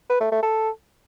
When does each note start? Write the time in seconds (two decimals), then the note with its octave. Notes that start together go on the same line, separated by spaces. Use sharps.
0.09 B4
0.20 A3
0.31 A3
0.43 A4